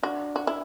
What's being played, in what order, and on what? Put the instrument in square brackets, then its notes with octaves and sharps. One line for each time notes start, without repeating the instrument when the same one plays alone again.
[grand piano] D4 [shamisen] F#4
[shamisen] F#4
E4